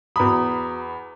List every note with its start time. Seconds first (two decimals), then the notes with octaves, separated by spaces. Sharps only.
0.16 E2 F#4 A#5 B5 D#6